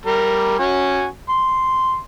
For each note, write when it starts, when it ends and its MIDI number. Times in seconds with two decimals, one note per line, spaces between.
0.06 0.54 55
0.06 0.54 70
0.59 1.06 61
0.59 1.06 66
0.59 1.06 80
1.29 1.98 84